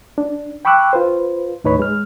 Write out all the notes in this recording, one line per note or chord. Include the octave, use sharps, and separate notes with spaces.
D4
G5 B5 C#6 D6 E6 F#6
F4 B4 C5
D#2 A2 D#4 B4 C#5 B5
G#3 F6